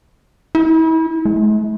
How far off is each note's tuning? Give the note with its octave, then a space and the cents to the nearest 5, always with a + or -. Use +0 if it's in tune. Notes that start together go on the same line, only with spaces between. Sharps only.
E4 -35
A3 -45